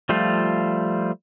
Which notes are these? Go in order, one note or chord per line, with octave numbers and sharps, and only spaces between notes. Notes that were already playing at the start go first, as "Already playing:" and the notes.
F3 G3 A3 F4